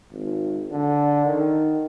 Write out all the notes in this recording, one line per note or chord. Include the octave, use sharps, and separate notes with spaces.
G#1
D3
D#3